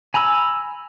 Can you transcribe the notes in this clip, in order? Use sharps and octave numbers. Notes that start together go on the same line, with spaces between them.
G#5 A#5 B5 E6